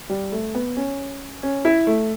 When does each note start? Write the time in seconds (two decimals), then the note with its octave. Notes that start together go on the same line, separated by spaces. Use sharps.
0.10 G3
0.32 A3
0.55 B3
0.77 C#4
1.43 C#4
1.65 E4
1.87 A3